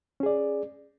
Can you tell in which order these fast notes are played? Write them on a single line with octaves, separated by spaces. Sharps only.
C#4 G#4 D5